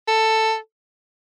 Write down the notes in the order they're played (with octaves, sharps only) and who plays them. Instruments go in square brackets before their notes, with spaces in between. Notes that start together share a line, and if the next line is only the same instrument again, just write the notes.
[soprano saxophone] A4